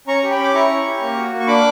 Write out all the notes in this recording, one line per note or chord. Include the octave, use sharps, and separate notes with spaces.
C#4 A#5 C#6
G4
G5 B5
C#4
D6
E4 A#5 C#6
C#4
G4
A#3
F#4
A#3
C#6
D4 B5 D6